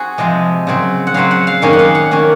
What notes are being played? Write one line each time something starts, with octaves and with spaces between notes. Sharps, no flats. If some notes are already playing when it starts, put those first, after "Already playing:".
Already playing: C4 F#4 G#4
C3 F3 G#3 D#5
C#3 F#3 C4
F#5
C#3 F#3 C4 F5
F#5
F5
F#2 D#3 A#3 C#4 D#5
F#5
F5
F#5
D#3 A#3 C#4